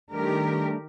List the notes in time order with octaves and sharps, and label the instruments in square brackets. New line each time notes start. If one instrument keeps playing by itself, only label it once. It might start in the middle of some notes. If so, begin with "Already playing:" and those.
[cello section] D#3 G4 A#4 [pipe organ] G3 A3 D4